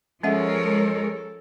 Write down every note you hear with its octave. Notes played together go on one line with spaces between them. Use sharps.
F3 G#3 C#4 A4 A#4 C#5 E5 F#5